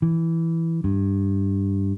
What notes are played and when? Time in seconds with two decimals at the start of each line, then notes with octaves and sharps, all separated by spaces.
0.02 E3
0.84 G2